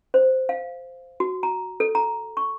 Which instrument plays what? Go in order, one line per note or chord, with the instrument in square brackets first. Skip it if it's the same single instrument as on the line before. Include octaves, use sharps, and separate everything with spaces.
[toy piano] C5
F5
F#4
A#5
A4
A#5
C#6